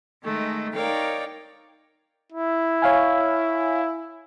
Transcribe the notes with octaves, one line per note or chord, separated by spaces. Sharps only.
D#3 G#3 A3
D#4 A#4 C#5 D5 F5 G5
E4
C#5 F5 G#5